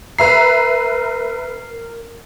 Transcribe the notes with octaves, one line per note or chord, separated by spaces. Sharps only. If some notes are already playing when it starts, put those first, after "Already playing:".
A#4 B4 E5 A#5 C7